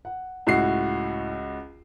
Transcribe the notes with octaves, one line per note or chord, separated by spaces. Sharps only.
F#5
C#2 A2 F#4 C7